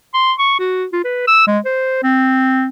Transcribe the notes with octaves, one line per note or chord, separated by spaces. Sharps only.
C6
C#6
F#4
F4
B4
E6
G#3
C5
C4